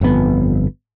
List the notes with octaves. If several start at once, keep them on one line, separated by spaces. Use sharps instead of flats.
G1 F2 A2 B3